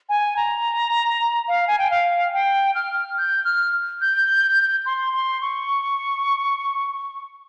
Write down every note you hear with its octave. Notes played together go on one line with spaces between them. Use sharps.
G#5
A#5
F5
G#5
G5
F5
G5
F6
G6
F6
G6
C6
C6
C#6